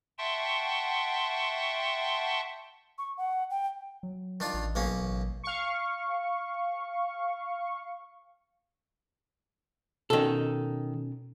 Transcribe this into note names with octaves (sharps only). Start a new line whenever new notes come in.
E5 F#5 G5 A5 C6 C#6
C#6
F#5
G5
F#3
D#3 D4 F4
A1
B1 A#3 C#4
A1
F5 C#6
B2 D#3 C#4 A4